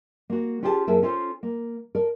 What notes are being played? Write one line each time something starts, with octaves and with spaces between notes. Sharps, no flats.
A#3 F#4
C#4 F4 G4 G#4 F#5 A5
F#2 A#3 E4 G#4 E5 A5
C#4 F4 A4 C5
A#3
A4 A#4 D5